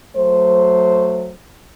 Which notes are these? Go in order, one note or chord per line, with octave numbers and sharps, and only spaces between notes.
F#3 A3 C5